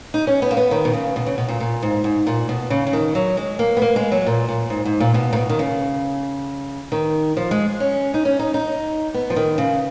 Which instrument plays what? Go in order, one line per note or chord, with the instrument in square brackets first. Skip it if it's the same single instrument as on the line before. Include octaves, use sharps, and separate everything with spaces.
[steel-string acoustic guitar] D#4
C#4
B3
A#3
B3
D#3
B2
C#3
B2
C#3
B2
A#2
A#2
G#2
G#2
A#2
B2
C#3
C#3
D#3
F#3
G#3
A#3
B3
A#3
G#3
F#3
A#2
A#2
G#2
G#2
A#2
B2
A#2
B2
D#3
C#3
D#3
F3
G#3
C#4
D#4
C#4
D#4
D#4
B3
F3
D#3
C#3